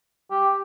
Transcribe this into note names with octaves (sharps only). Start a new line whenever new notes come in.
G4